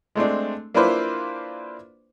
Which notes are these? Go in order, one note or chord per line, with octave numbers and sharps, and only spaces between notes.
G#3 A3 C4 D4
A#3 D4 E4 F4 B4 C5